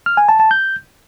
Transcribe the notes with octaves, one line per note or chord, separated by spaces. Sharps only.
F6
G#5
A5
A5
G6